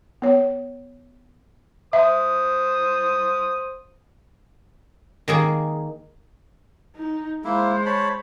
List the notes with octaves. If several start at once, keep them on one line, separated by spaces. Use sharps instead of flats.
B3 C#5
C5 E5 D#6
D#3 A#3 G#4
D#4
G#3 A#3 E4 C5
C#5 A5 B5